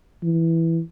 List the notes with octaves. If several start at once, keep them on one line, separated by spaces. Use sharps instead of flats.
E3